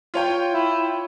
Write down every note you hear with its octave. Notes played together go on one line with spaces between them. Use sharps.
F4 C#5 G5
E4